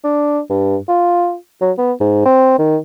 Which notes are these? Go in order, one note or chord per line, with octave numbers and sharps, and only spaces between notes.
D4
G2
F4
F#3
B3
G#2
C4
D#3